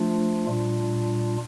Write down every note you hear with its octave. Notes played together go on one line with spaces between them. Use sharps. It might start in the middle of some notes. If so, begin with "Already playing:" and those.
Already playing: F3 A3 D4 F4
A#2 G3 D4 F4